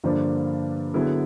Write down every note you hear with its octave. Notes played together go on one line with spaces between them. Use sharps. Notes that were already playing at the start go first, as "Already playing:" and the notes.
G2 D3 F3 A#3 D4
D3 F#3 B3 E4 G#4